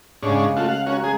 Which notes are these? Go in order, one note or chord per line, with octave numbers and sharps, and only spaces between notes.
G#2 C#3 G#3 C#4 D4
A3 F4 F#4
F5 F#5
C#4 F#4 A#4
G#3 G#4